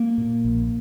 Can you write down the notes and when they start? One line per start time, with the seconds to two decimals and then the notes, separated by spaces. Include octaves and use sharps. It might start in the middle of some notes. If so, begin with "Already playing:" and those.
Already playing: A#3
0.18 A#2
0.45 A#1